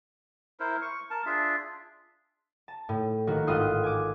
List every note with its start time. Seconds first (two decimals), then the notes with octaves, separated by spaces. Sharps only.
0.60 E4 A#4 C5
0.82 C#6
1.10 A#4 A5
1.26 D4 F4 G#4 E5
2.68 A5
2.89 A2
3.27 A#1 D#3 F#4
3.47 G#1 A2 F4 C6 D#6 F#6
3.84 G#5 D6